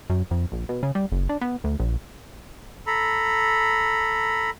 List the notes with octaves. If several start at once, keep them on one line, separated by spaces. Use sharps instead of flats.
F#2
F2
A#1
B2
C#3
G3
F#1
D4
B3
D2
A#1
A4 A#5 B5